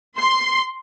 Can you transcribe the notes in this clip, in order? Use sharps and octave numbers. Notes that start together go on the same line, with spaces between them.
C6